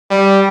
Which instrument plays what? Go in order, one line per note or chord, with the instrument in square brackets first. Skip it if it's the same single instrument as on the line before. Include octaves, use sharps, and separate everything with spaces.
[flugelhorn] G3